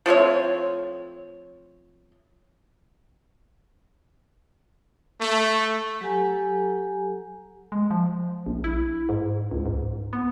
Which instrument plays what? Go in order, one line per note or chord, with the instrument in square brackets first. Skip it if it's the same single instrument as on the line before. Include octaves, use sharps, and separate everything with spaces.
[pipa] F3 A3 C4 C#5
[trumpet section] A3
[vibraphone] F#3 G4 A4 F#5 G#5 A#5
[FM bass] G#3
F3
A#1
E4
G#2
C#2
G#2
B3